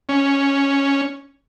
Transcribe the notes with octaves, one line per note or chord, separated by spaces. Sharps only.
C#4